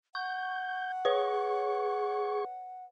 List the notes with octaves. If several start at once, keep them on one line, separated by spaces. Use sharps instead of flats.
F#5 C#6 G6
G#4 B4 C#5 C#6